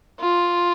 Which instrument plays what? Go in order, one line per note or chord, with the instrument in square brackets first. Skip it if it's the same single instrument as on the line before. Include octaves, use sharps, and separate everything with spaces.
[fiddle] F4